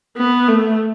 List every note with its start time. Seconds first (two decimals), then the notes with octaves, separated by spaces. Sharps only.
0.17 B3
0.48 A3